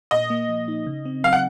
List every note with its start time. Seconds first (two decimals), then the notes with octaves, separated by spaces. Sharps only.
0.11 A#2 D#5
0.30 A#3
0.49 F3
0.68 D#4
0.86 C#3
1.05 C4
1.24 F#3 F5
1.33 F#5